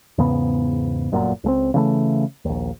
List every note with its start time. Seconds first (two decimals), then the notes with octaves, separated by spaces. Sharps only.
0.18 E2 G#2 C#3 B3
1.12 G1 F#2 A#2
1.44 C#2 A3 C4
1.74 C#3 E3 F#3 A3
2.45 A#1 D#2